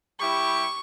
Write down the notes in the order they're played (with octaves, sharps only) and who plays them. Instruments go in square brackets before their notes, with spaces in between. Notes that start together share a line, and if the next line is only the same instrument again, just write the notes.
[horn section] G3 E4 G4 [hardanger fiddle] C#6